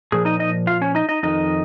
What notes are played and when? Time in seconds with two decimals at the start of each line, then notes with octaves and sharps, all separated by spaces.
0.12 A#2 F3 G#4
0.25 D#4 D#5
0.39 D#4 D#5
0.67 F4 F5
0.81 C#4 C#5
0.95 D#4 D#5
1.09 D#4 D#5
1.23 F2 D#3 D#4 D#5